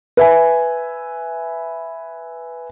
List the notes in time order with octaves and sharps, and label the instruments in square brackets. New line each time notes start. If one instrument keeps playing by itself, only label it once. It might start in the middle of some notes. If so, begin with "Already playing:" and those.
[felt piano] B4 E5 G#5